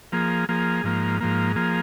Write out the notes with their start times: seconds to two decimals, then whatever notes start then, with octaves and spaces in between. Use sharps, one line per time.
0.12 F3 A#3 G#4
0.49 F3 A#3 G#4
0.84 G#2 F3 A#3
1.20 G#2 F3 A#3
1.56 F3 A#3 G#4